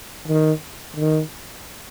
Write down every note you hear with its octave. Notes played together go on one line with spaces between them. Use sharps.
D#3
D#3